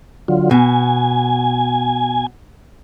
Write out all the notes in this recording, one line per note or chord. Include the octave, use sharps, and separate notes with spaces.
D3 F#3 F4
B2 G#5